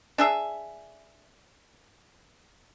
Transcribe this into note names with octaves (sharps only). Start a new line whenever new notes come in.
D4 G#4 E5